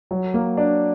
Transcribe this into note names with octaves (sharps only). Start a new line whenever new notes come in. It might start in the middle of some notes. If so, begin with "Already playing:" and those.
F#3
A#3
D4